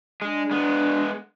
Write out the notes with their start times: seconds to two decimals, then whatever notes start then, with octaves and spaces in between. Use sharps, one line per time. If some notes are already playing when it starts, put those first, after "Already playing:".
0.22 G#3 D4
0.51 G#3 B3